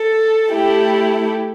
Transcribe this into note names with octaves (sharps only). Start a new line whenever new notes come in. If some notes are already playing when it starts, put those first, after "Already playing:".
Already playing: A4
A3 E4 G4